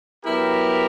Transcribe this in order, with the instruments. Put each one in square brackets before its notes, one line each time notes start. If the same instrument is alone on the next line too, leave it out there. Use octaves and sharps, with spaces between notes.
[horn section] F#3 B3 E4 G4 A#4